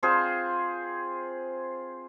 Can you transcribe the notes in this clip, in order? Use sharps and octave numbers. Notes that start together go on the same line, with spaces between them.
C4 F4 G#4 C5